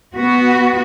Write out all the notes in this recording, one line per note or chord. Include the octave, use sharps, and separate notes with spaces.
B3 F#4